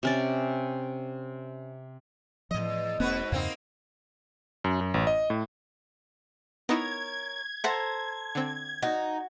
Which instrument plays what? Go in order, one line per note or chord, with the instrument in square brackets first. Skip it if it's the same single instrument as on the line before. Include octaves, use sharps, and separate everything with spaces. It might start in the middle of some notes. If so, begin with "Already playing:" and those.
[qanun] C3 C#4 D5
[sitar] E2 D#5 [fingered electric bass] A2 F3
[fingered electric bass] E1 A#3 C4 [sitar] G#2 F#4 B4
[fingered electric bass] E2 G2 C#3 [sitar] A#3 C4 D#4
[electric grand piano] F#2
F#2
A1
D#5
A2
[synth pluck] B3 D#4 E4 [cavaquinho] A#4 C#5 [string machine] G#6
[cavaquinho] A4 C5 A#5 [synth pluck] E5 F#5
[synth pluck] D3 C4
[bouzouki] D#4 [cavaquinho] F#4